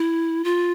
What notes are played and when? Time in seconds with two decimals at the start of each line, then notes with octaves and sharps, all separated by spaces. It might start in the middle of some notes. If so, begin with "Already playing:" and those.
Already playing: E4
0.44 F4